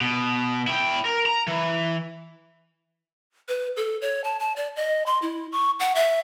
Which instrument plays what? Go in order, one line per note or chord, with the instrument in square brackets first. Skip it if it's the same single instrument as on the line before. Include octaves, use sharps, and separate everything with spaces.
[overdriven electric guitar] B2
E4 G5
A#4
A#5
E3
[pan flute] B4
A4
C#5
A5
A5
D5
D#5
C6
E4
C#6
F#5
E5